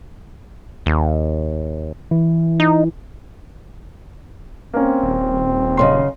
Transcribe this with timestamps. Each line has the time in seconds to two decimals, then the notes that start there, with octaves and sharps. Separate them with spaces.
0.86 D#2
2.11 E3
2.60 D#4
4.74 A#3 C4 C#4
5.03 D#1
5.77 F#2 A2 C#3 D#5 C6